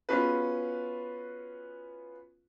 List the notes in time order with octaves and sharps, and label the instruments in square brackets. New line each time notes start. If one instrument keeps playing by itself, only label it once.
[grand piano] B3 C#4 F4 F#4 G#4 B4